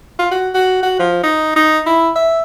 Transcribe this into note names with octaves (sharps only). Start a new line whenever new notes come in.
F4
F#4
F#4
F#4
F3
D#4
D#4
E4
E5